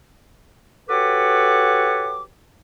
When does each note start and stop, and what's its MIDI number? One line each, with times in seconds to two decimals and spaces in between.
0.89 2.22 66
0.89 2.22 67
0.89 2.22 69
0.89 2.22 71
0.89 2.22 73
0.89 2.22 86